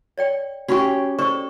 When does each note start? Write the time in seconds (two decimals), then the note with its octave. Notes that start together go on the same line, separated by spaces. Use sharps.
0.18 C#5 D5 G5
0.68 C#4 F#4 G4 B5 C#6
1.19 A4 C5 D5 C#6